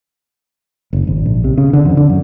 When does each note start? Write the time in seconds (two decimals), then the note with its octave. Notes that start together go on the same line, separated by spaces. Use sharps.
0.93 F#1
1.07 G#1
1.26 A#1
1.44 C3
1.58 C#3
1.73 D3
1.85 F2
1.97 D3
2.10 F#2